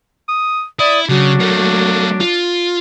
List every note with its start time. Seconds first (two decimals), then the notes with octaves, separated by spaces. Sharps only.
0.28 D#6
0.79 E4 D5 D#6
1.09 C#3 F#3 D4
1.40 A3 A#3
2.20 F4